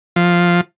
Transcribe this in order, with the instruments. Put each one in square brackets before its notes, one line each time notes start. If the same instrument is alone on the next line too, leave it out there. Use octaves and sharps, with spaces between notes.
[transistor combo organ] F3